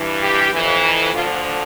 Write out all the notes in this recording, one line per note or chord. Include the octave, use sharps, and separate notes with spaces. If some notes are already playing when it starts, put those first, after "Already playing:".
Already playing: G2 E3
G4
F2 E3
D2 D3 F3 F4